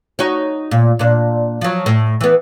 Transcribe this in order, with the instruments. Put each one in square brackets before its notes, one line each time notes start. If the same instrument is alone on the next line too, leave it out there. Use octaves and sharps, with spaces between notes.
[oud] D#4 F#4 C#5
A#2
A#2 D4
F3 F#3
A2
E3 B3